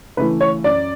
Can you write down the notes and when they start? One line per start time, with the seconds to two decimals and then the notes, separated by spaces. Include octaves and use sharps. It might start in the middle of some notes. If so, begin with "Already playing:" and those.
0.17 C#3 E3 A3 E4 B4
0.41 C#5
0.64 F#2 D5